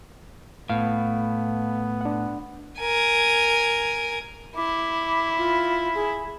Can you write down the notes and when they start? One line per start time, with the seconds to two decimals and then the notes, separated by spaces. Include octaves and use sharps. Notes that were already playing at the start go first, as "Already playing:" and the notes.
0.69 A2 B3 F5
2.01 D4 F#5
2.79 A#4 G#5
4.56 E4 D6
5.38 F4
5.95 G#4